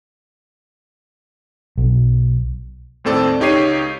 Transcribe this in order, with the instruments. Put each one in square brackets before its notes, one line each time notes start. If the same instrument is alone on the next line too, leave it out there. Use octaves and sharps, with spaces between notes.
[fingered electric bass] B1
[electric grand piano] D#2 A2 C4 A4 D5
C#2 D#4 G4 C#5 C7 D#7